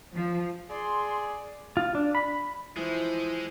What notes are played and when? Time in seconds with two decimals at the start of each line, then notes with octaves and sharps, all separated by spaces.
0.17 F3
0.70 G#4 D5 C6
1.77 F4
1.95 D4
2.15 B5
2.77 E3 F3 G#3 E4 C5